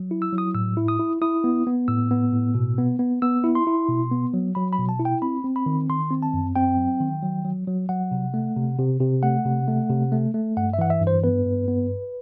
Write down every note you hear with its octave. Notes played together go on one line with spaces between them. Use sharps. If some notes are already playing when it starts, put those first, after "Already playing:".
Already playing: F#3
E4
E6
F#3
D#6
A2 E6
E4
D#6
E4
E4 D#6
B3
B3
A2 E6
B3
A2
B2
B3
B3
B3 E6
E4
C6
E4
B2
B3
F#3
F#3 B5
B5
B2
A5
E4
G5
C4 B5
C4
B5
D#3
D#3 C6
C4
A5
F#2
C4 G5
F#3
D#3
F#3
F#3
F#3
F#3 F#5
C3
A3
C3
C3
C3
A3 F#5
C3
A3
C3
A3
A3
G2 F#5
E5
E3 F#5
E5
G2
C5
B3 B4
G2
B3